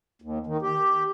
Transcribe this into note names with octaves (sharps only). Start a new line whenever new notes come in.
D#2
D#3
G4